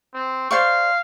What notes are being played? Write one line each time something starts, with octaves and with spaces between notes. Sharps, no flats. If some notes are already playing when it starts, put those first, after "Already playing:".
C4
C5 D5 F5 C#6